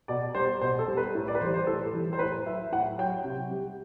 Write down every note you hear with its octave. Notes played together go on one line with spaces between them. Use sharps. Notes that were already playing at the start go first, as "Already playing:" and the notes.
B2 D5
G3 C5
B2 C5
A4
G3
B4
A2
D5
B4
E3 G3 C5
C5
A2 A4
E3 G3
C5
A2 B4
F#3 E5
A2 F#5
F#3 G5
C3
G3